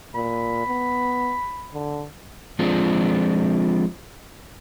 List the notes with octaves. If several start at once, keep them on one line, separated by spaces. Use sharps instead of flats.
A#2 B5
B3
D3
F3 G#3 C4 D4 F4